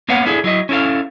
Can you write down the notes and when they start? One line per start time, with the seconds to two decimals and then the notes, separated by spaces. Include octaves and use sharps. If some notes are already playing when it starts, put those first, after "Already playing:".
0.09 A#3 B3 B4 C#5 F5 F#5
0.26 D4 E4 G#4 A4
0.44 F#3 E4 D#5
0.69 C#4 E4 A4 F5